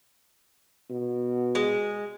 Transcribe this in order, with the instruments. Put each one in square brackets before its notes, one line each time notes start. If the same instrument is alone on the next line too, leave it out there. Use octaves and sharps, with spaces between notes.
[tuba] B2
[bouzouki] G#3